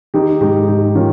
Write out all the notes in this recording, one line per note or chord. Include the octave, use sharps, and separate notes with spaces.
D#3 D#4 G4
G#2 D#4 G4
G#2 D#4 G4
D#3 C#4 F4